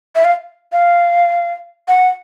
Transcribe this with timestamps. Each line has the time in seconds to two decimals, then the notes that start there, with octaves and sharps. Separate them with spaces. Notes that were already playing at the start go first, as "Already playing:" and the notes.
0.15 E5
0.25 F5
0.72 F5
1.88 F#5